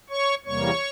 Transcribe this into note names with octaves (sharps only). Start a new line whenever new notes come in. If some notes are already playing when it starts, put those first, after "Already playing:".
C#5 C#6
E2 C3 G3 A#3 C#5 C#6